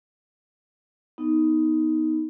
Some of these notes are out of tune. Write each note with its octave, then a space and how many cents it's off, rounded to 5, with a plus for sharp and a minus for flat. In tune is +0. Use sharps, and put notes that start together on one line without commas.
B3 +0 D#4 +10